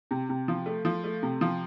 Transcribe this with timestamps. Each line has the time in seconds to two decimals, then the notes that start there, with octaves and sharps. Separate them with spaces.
0.11 C3
0.29 C3
0.48 F3
0.66 A3
0.85 F3
1.04 A3
1.23 C3
1.41 F3